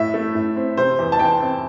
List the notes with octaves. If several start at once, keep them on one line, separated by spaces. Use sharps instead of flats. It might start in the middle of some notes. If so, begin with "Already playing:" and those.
Already playing: A2 E5
A3
A2
C4
C3 C5
E2
A5
E2 G5
C4